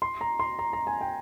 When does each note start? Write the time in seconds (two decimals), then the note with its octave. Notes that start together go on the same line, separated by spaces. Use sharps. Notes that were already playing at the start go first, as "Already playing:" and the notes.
0.02 C6
0.21 A#5
0.40 C6
0.59 A#5
0.73 A#5
0.87 G#5
1.01 G5